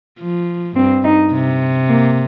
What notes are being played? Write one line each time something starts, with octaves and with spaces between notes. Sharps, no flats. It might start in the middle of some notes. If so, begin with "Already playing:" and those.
F3
G2 C4
D#4
C3
A#3